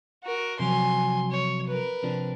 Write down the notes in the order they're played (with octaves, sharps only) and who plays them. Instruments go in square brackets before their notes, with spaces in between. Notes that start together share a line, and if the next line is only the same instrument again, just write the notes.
[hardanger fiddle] F#4 A#4
[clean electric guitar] C3 F3 F#3 [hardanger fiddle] G#5 C6
[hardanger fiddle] C#5
A#4 B4
[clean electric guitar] C3 F3 D4